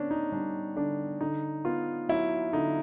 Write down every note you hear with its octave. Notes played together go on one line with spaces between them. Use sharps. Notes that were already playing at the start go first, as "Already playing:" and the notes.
Already playing: D3 B3 C#4 D4
D#4
G3 D4
D3 D4
D3 D#4
B3 F4
F#3 E4
D3 D#4